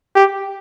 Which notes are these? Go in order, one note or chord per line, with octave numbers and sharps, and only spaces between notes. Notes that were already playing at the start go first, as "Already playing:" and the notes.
G4